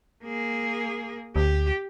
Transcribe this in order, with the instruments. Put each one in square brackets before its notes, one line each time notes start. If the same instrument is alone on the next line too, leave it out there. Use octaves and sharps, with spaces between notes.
[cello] A#3 G#4
[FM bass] D2 [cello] G4